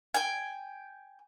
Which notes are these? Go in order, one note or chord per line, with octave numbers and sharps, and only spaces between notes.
G5 G#5